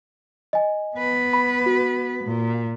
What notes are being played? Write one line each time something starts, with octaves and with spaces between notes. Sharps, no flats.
D#5 G#5
B3 B4
B5
F#4
A#2